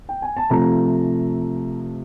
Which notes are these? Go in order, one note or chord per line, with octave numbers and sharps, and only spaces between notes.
G5
G#5
A5
C3 F3 A3 A#5